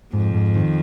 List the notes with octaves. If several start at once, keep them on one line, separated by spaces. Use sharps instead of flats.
F2 G#2
G#2
D#3